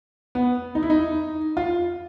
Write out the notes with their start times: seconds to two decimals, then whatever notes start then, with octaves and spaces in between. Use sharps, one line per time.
0.35 B3
0.75 D#4
0.83 E4
0.90 D#4
1.57 F4